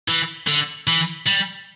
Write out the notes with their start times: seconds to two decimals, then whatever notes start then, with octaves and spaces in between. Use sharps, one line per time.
0.08 E3
0.47 D3
0.87 E3
1.26 G3